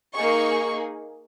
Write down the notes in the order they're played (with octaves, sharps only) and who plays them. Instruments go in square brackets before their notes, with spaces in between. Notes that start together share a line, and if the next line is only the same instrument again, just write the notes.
[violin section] A#3 D#4 G#4 C#6